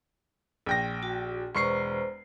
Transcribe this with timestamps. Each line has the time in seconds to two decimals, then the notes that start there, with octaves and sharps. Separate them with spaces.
0.66 A#1 G5 A#6
1.03 F#4
1.55 E1 B4 C5 A#5 C#6 C7